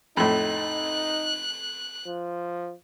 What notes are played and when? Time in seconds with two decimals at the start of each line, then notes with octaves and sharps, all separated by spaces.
0.17 F2 A2 D#4 F#6
2.06 F3